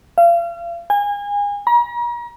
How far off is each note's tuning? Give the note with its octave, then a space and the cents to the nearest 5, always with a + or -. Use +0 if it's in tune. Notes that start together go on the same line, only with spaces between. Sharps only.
F5 -35
G#5 -30
A#5 +40